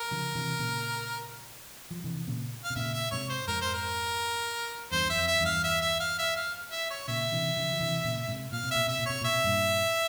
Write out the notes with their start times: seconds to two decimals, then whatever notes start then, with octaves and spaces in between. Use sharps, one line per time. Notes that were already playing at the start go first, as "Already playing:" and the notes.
Already playing: A#4
0.11 C#3 F3
0.35 C3 E3
0.59 A#2 C#3
1.91 F3
2.04 C3 E3
2.27 A#2 C#3
2.64 F5
2.70 C3
2.76 A#2 C#3 E5
2.94 E5
3.11 G#2 C3 C#5
3.29 C5
3.48 F2 G#2 A#4
3.61 C5
3.74 A#4
4.91 E2 G2 C5
5.06 E2 E5
5.16 F2
5.28 E5
5.40 E2 G2
5.46 F5
5.64 E5
5.82 E5
6.00 F5
6.19 E5
6.36 F5
6.72 E5
6.90 C#5
7.08 A#2 C#3 E5
7.32 C3 E3
7.56 C#3 F3
7.72 F3
7.80 C3 E3
8.04 A#2 C#3
8.28 G#2 C3
8.52 A#2 F5
8.64 C3
8.71 A#2 E5
8.87 C3 E5
8.99 A#2
9.06 C3 C#5
9.21 A#2 E5
9.33 C3
9.44 G2 A#2